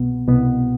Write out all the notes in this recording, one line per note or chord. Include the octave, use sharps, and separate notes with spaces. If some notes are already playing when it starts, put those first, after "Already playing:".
Already playing: C2 B2 B3
C2 B2 B3